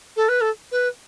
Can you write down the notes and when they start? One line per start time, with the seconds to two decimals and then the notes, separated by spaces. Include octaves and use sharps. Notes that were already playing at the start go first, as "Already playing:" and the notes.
0.16 A4
0.29 B4
0.41 A4
0.71 B4